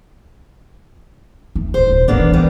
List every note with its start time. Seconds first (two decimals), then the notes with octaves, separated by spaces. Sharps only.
1.56 A3
1.74 D1 C5
1.89 D#1
2.08 A1 A#3 B3 D4
2.19 E3
2.33 G3 B3